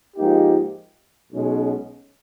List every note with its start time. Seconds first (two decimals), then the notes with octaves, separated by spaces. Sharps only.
0.16 G#2 F3 A#3 D#4 G4
1.32 B1 B2 G#3 C#4